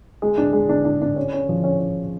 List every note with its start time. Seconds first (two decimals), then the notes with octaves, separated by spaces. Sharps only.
0.22 G#3
0.38 D4
0.53 G#3
0.69 D4
0.85 D4
1.01 D4
1.16 C#4
1.33 C#4
1.49 F3
1.64 C#4
1.80 C#4